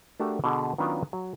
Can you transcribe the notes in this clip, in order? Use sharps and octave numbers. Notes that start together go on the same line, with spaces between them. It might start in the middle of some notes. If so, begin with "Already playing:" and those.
A3 D4 F#4 G4 A#4 A5
B2 D3 G#4
D#3 F#3 B3 C#4 D4 F4
F#3